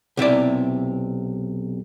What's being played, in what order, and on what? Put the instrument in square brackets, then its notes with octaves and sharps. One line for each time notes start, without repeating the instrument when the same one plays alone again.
[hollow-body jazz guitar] B1 C3 E4 D5